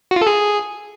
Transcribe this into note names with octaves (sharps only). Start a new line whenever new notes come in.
F#4
F4
A4
G#4